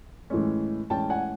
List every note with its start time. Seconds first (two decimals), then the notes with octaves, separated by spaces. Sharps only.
0.30 A2 E3 G#3 C#4
0.90 A2 E3 G#3 C#4 G5 A5
1.10 F#5 G#5